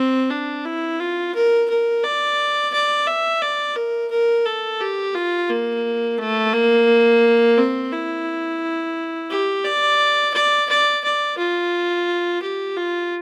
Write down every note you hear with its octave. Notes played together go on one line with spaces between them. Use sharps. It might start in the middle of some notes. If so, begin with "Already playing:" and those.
Already playing: C4
D4
E4
F4
A#4
A#4
D5
D5
E5
D5
A#4
A#4
A4
G4
F4
A#3
A3
A#3
C4
E4
G4
D5
D5
D5
D5
F4
G4
F4